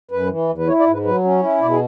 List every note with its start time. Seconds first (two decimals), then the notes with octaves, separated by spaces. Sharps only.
0.11 F#2 B4
0.30 E3
0.49 E2
0.58 B4
0.68 E4 C#5
0.80 D5
0.87 G#2
0.93 B4
1.05 F#3 B4
1.24 C#4
1.43 E4
1.61 B2 D5
1.71 G#4